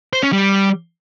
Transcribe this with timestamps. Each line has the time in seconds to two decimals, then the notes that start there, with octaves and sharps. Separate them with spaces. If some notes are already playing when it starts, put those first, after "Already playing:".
0.13 C5
0.23 C#4
0.32 G3